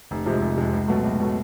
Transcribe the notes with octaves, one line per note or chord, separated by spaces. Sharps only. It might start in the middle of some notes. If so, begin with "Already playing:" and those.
F1
F2 C3 F3 G#3
F1
F2 C3 F3 G#3
C#2
B2 F#3 A3
C#2
B2 F#3 A3